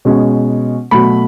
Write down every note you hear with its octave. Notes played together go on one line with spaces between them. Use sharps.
B2 G#3 C#4
B2 F#3 A3 B5